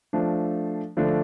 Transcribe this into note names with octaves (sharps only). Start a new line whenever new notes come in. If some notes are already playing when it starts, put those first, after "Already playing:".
F3 A3 D4
D3 F3 A3 D4